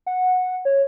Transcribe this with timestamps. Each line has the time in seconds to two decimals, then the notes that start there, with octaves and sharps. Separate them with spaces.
0.06 F#5
0.65 C#5